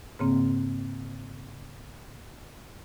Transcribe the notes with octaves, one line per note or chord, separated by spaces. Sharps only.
G#2 C#3 A#3 C4